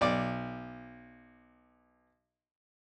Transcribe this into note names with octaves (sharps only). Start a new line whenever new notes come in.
B1 D5